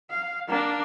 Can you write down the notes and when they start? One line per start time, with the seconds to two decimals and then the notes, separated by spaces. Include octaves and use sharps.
0.11 F5
0.48 A#3 D4